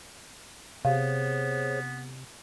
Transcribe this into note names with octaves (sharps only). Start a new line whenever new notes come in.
C3 B3 G#4 C5 C#5 F5